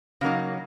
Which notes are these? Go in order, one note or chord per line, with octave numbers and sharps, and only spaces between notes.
C#3 F#3 A#3 D#4